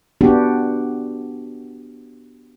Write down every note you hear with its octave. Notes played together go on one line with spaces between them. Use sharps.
B3 D4 F#4 G4